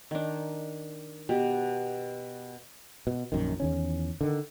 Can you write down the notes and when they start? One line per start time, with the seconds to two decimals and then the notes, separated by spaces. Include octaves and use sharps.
0.11 D#3 D4
1.29 B2 G4
3.07 B2
3.32 A#1 F#2 D#3
3.60 E2 D#3 C#4
4.21 D3 D#3